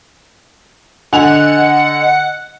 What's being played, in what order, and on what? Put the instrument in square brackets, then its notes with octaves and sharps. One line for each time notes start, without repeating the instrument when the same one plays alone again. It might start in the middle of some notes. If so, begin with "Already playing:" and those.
[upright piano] D3 G#5 F7 [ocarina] D#5 [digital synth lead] F#5